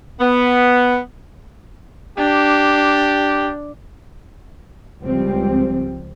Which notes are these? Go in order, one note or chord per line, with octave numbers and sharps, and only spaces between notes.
B3
D4 G4
C#2 F3 G3 C4